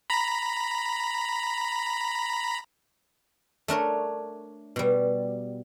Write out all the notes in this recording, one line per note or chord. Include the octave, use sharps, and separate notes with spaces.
A#5 B5
A3 D4 A#4 C#5
B2 G3